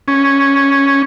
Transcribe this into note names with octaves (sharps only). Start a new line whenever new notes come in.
C#4